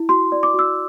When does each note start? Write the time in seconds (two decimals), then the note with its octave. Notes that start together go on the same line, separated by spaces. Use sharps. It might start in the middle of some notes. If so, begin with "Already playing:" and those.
Already playing: E4
0.09 F#4 C6
0.32 D5
0.43 D6
0.54 F#4 E6